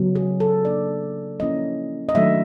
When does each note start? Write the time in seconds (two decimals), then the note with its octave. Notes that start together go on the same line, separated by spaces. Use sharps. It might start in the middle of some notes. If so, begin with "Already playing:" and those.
Already playing: C#3 F#3 B3
0.15 G#4
0.40 A4
0.65 F#3 A#3 D4 D5
1.40 F3 A#3 C#4 E4 D#5
2.09 D#5
2.15 D#3 F#3 A3 D4 E5